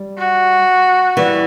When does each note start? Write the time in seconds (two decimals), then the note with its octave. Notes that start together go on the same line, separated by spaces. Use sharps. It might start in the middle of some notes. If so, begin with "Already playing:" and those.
Already playing: G3
0.18 F#4
1.17 E3 G3